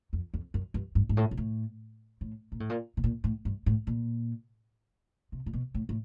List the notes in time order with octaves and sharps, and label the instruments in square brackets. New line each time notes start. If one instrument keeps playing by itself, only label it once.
[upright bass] F2
F2
F#2
G2
G2
G#2
A2
A#2
A2
A2
A#2
A2
A#2
B2
A#2
A2
G2
A2
A#2
C3
A#2
B2
A2
A2